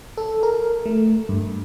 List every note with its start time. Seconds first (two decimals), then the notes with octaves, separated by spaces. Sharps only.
0.18 A4
0.43 A#4
0.86 A3
1.29 G2